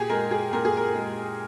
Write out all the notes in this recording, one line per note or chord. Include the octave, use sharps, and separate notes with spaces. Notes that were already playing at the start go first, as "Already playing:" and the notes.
Already playing: A#2 G4 G#4
G#3 A#4
G#4
A#2 A#4
G#4
A#4
G#3